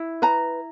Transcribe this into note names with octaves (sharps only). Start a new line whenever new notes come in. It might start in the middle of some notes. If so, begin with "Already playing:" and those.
Already playing: E4
B4 A#5